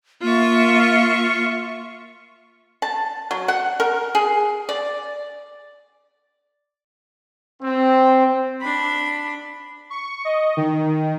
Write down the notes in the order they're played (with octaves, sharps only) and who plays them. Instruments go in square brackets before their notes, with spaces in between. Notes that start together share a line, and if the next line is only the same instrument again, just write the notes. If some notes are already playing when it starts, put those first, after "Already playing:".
[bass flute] A#3 [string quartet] F4 E5 C#6
[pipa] A5
F#3
F#5
A#4
G#4
D5
[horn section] C4
[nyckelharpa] D4 B5
[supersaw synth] C#6
D#5
D#3